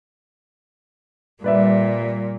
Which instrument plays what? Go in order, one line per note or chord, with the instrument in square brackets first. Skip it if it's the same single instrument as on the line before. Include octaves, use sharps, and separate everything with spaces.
[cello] A#2 [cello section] G3 [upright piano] B4 D5 E5